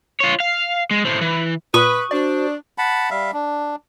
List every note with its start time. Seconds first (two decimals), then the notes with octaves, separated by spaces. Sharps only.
0.20 F4 C#5
0.40 F5
0.91 G#3
1.05 A2 C4
1.21 E3
1.74 A#2 B4 C#6 D#6
2.11 D4 F#4 C5 D5
2.78 F#5 A5 B5
3.10 G3 E5 F5
3.33 D4